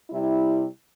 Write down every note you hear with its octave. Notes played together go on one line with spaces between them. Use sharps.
C3 G3 E4